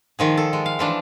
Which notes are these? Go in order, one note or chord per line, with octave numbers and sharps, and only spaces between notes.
D#3 F3 G#4
A4
G#3
F5
E3 F3 D4